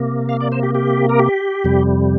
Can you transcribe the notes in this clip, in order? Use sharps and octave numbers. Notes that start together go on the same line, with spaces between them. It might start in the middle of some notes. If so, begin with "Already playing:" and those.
Already playing: C3 A#3
F5
D5
C5
G4
G4
A#4
G4
F2 C3 G3